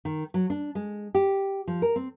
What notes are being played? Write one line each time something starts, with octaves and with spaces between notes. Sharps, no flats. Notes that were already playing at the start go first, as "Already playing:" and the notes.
D#3
F#3
D4
G#3
G4
F3
A#4
C4